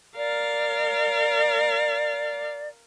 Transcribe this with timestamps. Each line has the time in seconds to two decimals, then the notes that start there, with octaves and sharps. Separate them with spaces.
0.17 A#4 D5 F5